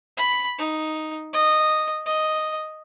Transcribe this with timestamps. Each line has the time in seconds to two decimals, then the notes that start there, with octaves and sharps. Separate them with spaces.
0.17 B5
0.58 D#4
1.33 D#5
2.06 D#5